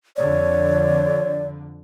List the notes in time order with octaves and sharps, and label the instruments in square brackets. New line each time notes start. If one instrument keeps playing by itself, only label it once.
[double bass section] F2 D3 [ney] C#5 [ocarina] D5